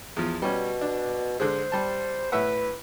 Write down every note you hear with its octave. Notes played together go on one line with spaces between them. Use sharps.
E2 F3
B2 G3 C#4
D4
D3 G#3 C5
G3 A5
A2 B4 E5 F#5